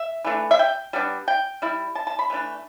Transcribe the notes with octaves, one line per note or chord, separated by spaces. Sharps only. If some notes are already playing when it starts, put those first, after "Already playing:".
Already playing: E5
E3 A3 D4
E5
G5
G3 B3 D4
G5
G3 E4
A5
A5
B5
E3 A3 D4